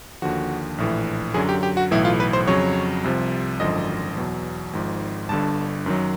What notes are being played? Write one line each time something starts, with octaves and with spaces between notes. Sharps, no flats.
D#2 D3 F3 F#4
A#1 A2 E3
F#2 D3 F#3 G#4
G4
G4
F#4
B1 A2 E3 E4
F4
B4
C5
F2 C#3 F#3 C#5
C2 C3 F3
G#1 F#2 D3 F3 D#5
E2 B2 F#3
G#1 G#2 F3
G1 G2 D3 A5
F#2 D#3 F#3